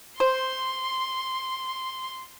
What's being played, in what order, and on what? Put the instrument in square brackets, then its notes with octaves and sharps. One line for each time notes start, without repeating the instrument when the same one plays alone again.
[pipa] C5 [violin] C6